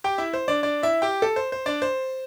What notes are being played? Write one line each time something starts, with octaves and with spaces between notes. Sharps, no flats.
G4 G5
E4 E5
C5
D4 D5
D4 D5
E4 E5
G4 G5
A4
C5
C5
D4 D5
C5